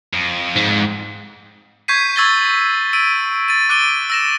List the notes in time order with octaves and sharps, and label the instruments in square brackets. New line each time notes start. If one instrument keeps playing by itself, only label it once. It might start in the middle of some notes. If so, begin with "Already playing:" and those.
[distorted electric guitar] F2
[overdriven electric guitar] G#2
[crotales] C#6 G6 G#6 B6 C7 D#7
C#6 E6 G#6 A6 B6 G7
E6 D7 D#7
A6 D#7
D6 F#6 A6 D7 D#7 G7
E6 A#6 E7